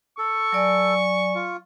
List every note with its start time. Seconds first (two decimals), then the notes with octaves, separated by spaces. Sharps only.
0.18 A4 C#6
0.52 F#3 D5 G#5
1.35 F4